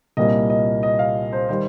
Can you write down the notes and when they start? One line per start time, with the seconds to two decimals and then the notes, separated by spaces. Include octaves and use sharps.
0.17 C2 A#2 G3 A#3 D#5
0.50 D#5
0.83 D#5
0.99 F5
1.32 C5
1.49 D#3 G3 C5